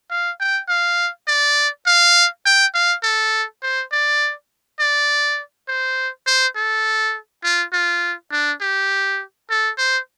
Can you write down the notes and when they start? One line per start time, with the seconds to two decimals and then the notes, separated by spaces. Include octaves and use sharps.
0.10 F5
0.40 G5
0.69 F5
1.28 D5
1.86 F5
2.46 G5
2.74 F5
3.03 A4
3.62 C5
3.92 D5
4.80 D5
5.68 C5
6.26 C5
6.56 A4
7.44 F4
7.73 F4
8.32 D4
8.61 G4
9.50 A4
9.78 C5